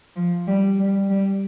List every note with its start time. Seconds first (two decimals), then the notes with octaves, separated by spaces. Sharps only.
0.16 F3
0.48 G3
0.79 G3
1.10 G3